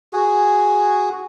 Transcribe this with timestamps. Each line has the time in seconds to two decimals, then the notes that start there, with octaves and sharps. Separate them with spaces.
0.13 F#4 G#4